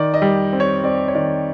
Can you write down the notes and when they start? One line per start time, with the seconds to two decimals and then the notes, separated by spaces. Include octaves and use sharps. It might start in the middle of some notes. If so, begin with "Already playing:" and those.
Already playing: D#3 D5
0.14 D#5
0.22 G3
0.53 C4
0.60 C#5
0.84 C4 D5
1.08 C#5
1.15 D#3 D5